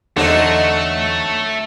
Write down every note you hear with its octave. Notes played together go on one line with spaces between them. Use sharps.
E2 D3 F#3 A3 C4 D#4